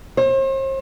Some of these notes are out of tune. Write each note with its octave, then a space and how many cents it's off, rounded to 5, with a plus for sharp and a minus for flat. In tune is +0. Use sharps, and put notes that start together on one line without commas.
C5 +40